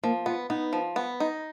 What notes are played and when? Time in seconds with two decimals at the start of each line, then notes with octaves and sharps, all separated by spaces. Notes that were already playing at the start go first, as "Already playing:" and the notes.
0.03 F3 A#3
0.26 B3 F4
0.50 B3 D#4
0.73 F3
0.96 B3
1.20 D#4